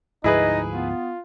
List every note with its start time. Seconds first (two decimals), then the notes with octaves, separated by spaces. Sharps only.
0.24 D2 G#2 F3 D#4 E4 G#4 B4 D#5
0.73 B3 F4